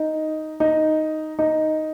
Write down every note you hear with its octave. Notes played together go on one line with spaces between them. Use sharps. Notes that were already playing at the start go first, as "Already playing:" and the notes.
Already playing: D#4
D#4
D#4